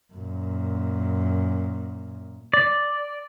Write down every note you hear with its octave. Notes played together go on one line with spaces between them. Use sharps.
F#2 A#2
D5